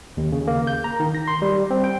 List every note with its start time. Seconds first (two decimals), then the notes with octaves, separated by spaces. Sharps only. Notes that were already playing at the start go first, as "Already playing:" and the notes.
0.17 D#2
0.32 C#3
0.47 A#3
0.67 G6
0.84 A#5
1.00 D#3
1.15 A#6
1.28 C6
1.42 G3
1.70 C4
1.84 G5